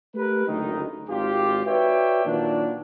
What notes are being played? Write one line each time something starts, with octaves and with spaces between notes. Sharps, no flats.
A3 G4 A#4 B4
F#1 D2 D#3 D#4
G#1 F4 G4
F#4 B4 C#5 D5 E5 G5
A#2 D#3 F#3 A#3 D4